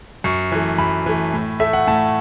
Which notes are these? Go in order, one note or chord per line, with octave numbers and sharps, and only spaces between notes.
F#2 C#6
E3 A3
F#2 B5
E3 A3
A2
A3 E5
F#5
A2 A5